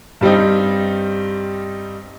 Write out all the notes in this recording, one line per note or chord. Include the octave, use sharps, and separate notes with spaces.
G2 G3 C4 D#4